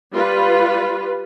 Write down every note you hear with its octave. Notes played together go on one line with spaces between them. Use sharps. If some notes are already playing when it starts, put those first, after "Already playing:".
G3 F4 B4